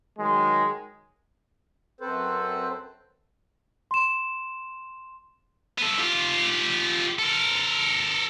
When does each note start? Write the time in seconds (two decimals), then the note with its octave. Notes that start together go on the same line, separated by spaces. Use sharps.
0.18 D#3 F#3 G#3
2.01 F#2 C4 A4 B4 C5
3.91 C6 E7
5.78 B3 A4
5.98 F4 G4
7.19 A4 A#4